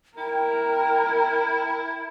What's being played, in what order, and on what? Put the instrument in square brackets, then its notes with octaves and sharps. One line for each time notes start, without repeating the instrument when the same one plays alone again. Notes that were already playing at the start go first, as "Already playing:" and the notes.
[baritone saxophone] E4 [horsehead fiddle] A#4 [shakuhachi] G5